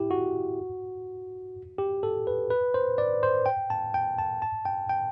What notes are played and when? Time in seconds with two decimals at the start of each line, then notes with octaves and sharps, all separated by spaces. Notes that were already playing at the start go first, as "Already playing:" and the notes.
Already playing: E4 G4
0.11 F#4
1.78 G4
2.03 A4
2.27 B4
2.50 B4
2.74 C5
2.98 D5
3.23 C5
3.46 G5
3.70 A5
3.94 G5
4.18 A5
4.42 A5
4.65 G5
4.89 G5